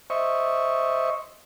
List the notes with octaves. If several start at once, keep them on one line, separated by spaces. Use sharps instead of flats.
C5 D#5 E5 C#6